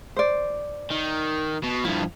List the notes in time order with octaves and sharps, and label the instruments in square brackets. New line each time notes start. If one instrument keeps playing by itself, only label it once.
[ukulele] C5 D5
[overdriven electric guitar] D#3
B2
[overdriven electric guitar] G2 F3 [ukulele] E4